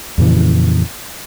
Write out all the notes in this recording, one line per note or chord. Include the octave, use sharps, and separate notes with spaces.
F2 A#2 C#3 E3